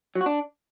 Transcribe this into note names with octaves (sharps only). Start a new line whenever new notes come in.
F#3
F#4
D4